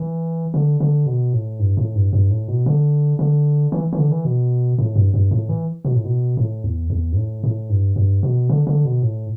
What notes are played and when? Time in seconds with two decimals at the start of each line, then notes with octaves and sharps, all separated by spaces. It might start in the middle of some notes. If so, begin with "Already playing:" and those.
Already playing: E3
0.54 D3
0.80 D3
1.06 B2
1.33 A2
1.60 G2
1.77 A2
1.95 G2
2.13 G2
2.31 A2
2.48 B2
2.66 D3
3.19 D3
3.72 E3
3.93 E3
3.99 D3
4.11 E3
4.25 B2
4.78 A2
4.96 G2
5.14 G2
5.31 A2
5.49 E3
5.85 B2
5.94 A2
6.04 B2
6.37 A2
6.64 E2
6.90 E2
7.12 G2
7.17 A2
7.44 A2
7.70 G2
7.96 G2
8.23 B2
8.49 D3
8.67 D3
8.85 B2
9.02 A2